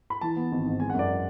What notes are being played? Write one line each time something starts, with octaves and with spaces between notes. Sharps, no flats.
B5
E3 A5
B3
G#1
G#2
G#3 G#5
F#5
F#2 D5